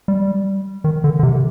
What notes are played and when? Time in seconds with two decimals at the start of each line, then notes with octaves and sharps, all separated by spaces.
0.08 G3
0.84 D#3
1.04 D3
1.19 D3
1.23 C3